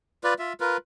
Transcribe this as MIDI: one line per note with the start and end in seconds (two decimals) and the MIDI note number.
0.24 0.34 65
0.24 0.34 71
0.24 0.34 74
0.39 0.53 65
0.39 0.53 76
0.60 0.77 65
0.60 0.77 70
0.60 0.77 71